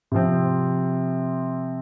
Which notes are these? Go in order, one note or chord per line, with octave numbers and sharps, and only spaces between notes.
C3 F3 C4